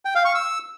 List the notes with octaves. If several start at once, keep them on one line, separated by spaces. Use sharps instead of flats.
G5
F5
C#6
E6